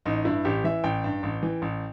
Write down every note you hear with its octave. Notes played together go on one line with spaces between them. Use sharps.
A1 D#4
G2 E4
A1 G4
E3 E5
A1 G5
G2
A1
E3
A1